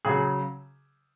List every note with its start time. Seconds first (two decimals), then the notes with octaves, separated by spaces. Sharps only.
0.05 C#3 F#3 G#4